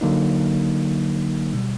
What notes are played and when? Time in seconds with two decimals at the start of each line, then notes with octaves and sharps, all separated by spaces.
0.01 D3 F#3 A#3 D#4
1.54 B2 G3